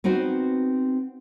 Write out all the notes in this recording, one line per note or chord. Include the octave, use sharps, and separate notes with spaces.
B3 C4 D#4 F#4 C5